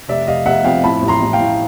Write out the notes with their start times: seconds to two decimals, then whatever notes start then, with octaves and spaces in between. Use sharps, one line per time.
0.09 F1 D5 E5
0.27 F1 D#5 F5
0.46 F1 E5 F#5
0.64 F2 F5 G5
0.84 A2 A5 B5
1.02 A1
1.08 A#5 C6
1.22 A2
1.33 F5 G5
1.40 A2